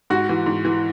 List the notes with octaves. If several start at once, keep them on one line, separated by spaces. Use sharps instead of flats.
G#2 F#4
E3
G#2
E3